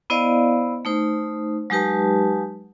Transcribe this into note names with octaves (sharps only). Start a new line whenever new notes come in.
B3 E4 C5 D5 D#5 F5
A3 D#4 C5
F#3 G#3 D#4 G4 B4 A5